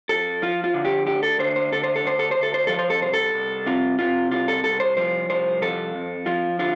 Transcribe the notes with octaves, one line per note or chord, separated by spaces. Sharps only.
F2 A4
F3 F4
F4
D3
G4
D2 G4
A4
D3 C5
C5
D2 A4
C5
A4
D2 C5
A4
C5
D2
A4
C5
F3 A4
C5
A4
C2 C5
A4
C2
C3 F4
C3 F4
C2 F4
A4
C2 A4
C5
F3 C5
C2 C5
F3 A4
F2
F3 F4
D3 F4